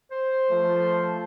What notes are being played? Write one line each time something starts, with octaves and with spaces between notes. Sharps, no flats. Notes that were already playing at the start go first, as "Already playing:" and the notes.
C5
F3 A3